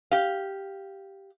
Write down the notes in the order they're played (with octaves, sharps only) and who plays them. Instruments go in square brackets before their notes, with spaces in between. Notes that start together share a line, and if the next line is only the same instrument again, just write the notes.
[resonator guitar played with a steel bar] G4 F5